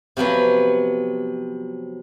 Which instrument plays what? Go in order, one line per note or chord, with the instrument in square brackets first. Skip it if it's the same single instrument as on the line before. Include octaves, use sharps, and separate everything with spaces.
[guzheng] C3 F3 F#3 B3